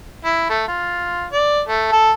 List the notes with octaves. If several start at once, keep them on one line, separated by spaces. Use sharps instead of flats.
E4
A3
F4
D5
A3
A4